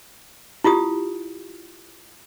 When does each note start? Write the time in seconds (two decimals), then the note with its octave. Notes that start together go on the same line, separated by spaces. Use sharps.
0.64 E4 F4 G4 D#6